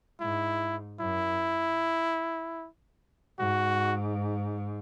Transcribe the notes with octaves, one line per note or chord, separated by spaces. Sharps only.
G#2 E4
F#2 E4
G#2 F#4